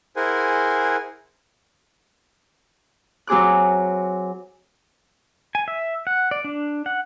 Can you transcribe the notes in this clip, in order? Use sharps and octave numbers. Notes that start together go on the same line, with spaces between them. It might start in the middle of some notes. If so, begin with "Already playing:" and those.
E4 G#4 A#4 C5 F#5 G#5
F#3 C4 G#4 D6 F#6
G#5
E5
F#5
D5
D4
F#5